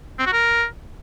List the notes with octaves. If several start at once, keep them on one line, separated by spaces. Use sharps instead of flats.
C4
F#4
A#4